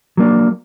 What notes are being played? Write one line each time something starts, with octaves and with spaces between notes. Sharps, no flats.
F#3 A#3 D4